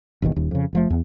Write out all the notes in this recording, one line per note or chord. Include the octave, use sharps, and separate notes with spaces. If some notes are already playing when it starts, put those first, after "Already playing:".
F#1 B1 E2 D#3
D#1 D#2
F2 C#3
F#1 F3 A3
E2